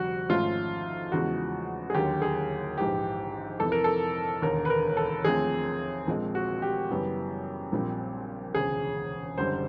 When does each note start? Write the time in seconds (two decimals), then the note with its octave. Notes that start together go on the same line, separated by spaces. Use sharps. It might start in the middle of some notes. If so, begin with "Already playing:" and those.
Already playing: F1 F2 D3 G3 F#4
0.29 G#1 G#2 F3 A3 C#4 F4
1.12 E2 C#3 F3 G#3 F#4
1.90 G#4
1.94 D#2 D3 F#3 A#3 G4
2.22 G#4
2.78 A#1 G#2 E3 G4
3.60 F2 C3 E3 A4
3.72 A#4
3.84 A4
4.42 E1 D#2 D3 A#4
4.65 B4
4.70 A#4
4.97 A4
5.24 D#2 D3 F3 A3 C4 G#4
6.07 A#1 A#2 F3 G#3 C4
6.35 F#4
6.62 G4
6.90 F#2 C#3 E3 G3 B3
7.72 A#1 A#2 G3 C4
8.55 E1 D2 C#3 G#4
9.37 F#1 F#2 D3 G3 C5